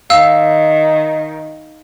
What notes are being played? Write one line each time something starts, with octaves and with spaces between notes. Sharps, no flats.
D#3 F5 E6